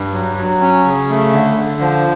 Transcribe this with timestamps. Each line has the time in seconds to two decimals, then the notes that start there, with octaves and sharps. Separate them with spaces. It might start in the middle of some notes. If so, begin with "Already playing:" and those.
Already playing: G2
0.13 F#3
0.37 F#3
0.61 C#4
0.85 C#3
1.09 A3
1.32 D3
1.56 D3
1.80 F3